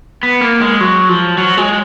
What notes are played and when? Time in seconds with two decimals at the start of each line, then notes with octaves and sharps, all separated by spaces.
0.23 B3
0.41 A#3
0.61 G#3
0.80 F#3
1.09 F3
1.38 F#3
1.57 G#3